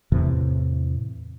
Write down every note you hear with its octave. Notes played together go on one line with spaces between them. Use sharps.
E2 A2 C3 E3